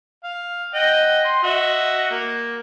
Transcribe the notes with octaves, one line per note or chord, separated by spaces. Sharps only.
F5
D#5 F#5 G5
C6
F#4 D#5 E5
A#3